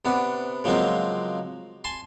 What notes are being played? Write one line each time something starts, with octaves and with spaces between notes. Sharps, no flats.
C3 B3 D4
C#3 F3 F#3 G#3 A#3 C4
G#5 A5 C6